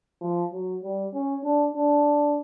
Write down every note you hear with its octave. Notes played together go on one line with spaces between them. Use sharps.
F3
F#3
G3
C#4
D4
D4